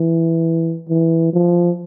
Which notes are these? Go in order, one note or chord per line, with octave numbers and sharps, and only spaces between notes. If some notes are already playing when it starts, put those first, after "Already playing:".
Already playing: E3
E3
F3